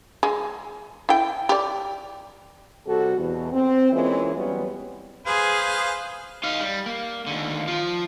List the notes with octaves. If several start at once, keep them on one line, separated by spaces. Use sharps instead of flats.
G#3
E4 G5
G4 D5
C3 G3 F#4 A4
E2 B2
C4
E3 G#3 A#3 C#4 E4 F4
E3 F#3 G3 B3 C#4
G#4 B4 C5 F5
D#4 F5
G3
A#3
D#2 D3
F3 F4